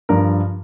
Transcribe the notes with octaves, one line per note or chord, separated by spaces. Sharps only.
G2 F3 A#4